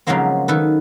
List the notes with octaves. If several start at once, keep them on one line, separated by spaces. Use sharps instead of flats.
C#3 F3 F#3 G#3 A#3 C4
D#3 A4 B4